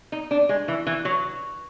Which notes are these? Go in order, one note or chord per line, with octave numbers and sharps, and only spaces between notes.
D#4
D4
G#3
E3
E3
F#3